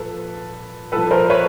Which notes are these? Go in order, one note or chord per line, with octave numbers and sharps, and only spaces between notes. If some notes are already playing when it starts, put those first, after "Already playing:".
Already playing: A#2 F3 A4 B4
A#2 F3 A4 B4
A#4 C5
B4 C#5